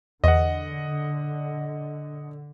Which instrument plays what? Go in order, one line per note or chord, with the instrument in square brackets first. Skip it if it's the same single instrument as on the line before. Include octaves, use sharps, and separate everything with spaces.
[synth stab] E2 [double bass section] D3 [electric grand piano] D#5 F#5